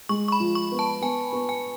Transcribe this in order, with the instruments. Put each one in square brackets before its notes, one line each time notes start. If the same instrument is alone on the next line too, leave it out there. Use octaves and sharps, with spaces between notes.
[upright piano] G#3 [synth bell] C#6
[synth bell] C#6
B5
[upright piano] F3
[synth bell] C#6
[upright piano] B3
[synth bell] A5
[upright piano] B3 [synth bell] G#5
[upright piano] B3
[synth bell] G#5